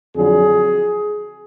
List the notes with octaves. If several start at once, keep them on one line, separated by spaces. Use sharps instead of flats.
F2 D3 F#3 G#4